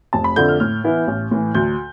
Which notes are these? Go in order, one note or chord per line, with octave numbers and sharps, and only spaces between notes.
F1 A5
B5
F2 D3 A3 G6
F6
A2 F6
E3 B3 E4
A1
A2 E3
D2 G6